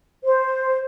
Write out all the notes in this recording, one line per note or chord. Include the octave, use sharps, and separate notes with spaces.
C5